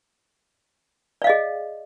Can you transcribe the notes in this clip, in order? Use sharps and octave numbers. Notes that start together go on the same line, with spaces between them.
G#4 D5 D#5 F5